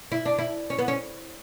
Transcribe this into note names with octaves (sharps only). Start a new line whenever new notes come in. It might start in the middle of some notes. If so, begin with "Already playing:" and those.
E4
D4
E4
C#4
B3
C#4